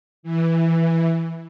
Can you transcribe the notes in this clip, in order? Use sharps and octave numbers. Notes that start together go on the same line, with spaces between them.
E3